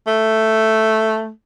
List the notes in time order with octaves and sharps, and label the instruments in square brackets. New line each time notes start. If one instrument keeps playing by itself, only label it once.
[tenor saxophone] A3